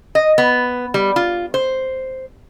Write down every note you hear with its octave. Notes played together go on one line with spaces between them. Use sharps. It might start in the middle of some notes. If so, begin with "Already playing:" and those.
D#5
B3
G3
F4
C5